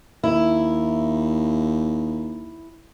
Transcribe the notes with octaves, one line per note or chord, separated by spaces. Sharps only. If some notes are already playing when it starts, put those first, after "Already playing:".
D#2 E4